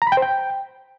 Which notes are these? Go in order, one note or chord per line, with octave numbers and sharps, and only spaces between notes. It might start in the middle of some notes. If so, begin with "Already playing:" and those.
A#5
B5
G5
C5
G5